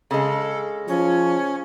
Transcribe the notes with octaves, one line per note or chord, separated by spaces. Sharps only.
C#3 G#3 A4
F3 C#4